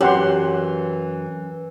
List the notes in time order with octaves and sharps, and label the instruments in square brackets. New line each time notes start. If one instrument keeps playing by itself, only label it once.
[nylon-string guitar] F#2 [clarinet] E3 [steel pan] G4 F#5 C6 [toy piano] C#5 D6